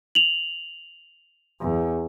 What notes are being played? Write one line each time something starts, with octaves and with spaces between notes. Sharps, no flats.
F7 F#7
E2